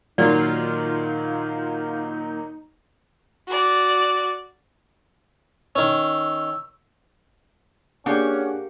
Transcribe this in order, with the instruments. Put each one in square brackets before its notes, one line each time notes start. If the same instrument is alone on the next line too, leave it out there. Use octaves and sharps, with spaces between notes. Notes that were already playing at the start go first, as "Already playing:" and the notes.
[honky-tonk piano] A#2 D#3 F#3 [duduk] D#4 [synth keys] F4 F5 [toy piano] D5
[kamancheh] F#4 D5
[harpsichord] D#3 C#4 [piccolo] E6
[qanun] A#3 G4 C#6 [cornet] C#4 [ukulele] D4 [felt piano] G#4 F#5